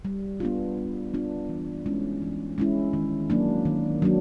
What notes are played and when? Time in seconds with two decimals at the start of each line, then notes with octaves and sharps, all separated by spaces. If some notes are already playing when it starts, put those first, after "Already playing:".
0.05 G3
0.40 B3 D4 F4
0.77 G3
1.14 B3 D4 F4
1.49 E3
1.86 G#3 C#4 E4
2.22 E3
2.58 G#3 C#4 E4
2.93 D#3
3.30 F#3 A#3 D4
3.65 D#3
4.02 F#3 A#3 D4